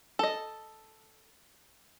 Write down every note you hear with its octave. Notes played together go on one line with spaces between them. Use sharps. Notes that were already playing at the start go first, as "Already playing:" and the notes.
A4 D#5